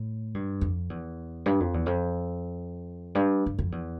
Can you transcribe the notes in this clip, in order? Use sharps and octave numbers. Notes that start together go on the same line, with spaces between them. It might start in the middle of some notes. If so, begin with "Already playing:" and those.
Already playing: A2
G2
F2
E2
G2
F2
E2
F2
G2
G2
F2
E2